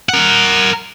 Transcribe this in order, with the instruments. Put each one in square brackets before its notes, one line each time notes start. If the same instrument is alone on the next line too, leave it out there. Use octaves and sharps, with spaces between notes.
[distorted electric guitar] A#4 F#5